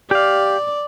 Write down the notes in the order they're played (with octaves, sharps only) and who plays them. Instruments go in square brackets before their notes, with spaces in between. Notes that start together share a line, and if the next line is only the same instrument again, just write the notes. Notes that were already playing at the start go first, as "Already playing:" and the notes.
[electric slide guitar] G4 F5 [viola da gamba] D5